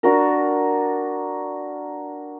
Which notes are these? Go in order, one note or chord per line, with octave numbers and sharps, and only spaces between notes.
D4 F#4 A#4